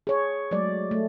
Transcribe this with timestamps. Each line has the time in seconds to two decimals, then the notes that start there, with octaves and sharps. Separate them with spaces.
0.07 G#4 C#5
0.51 F#3 G#3 A3 D5
0.91 A3